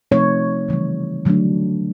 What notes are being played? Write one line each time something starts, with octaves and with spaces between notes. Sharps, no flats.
C3 F3 A3 C4 D#4 C#5
C#3 E3 G3
D3 F#3 A3 D4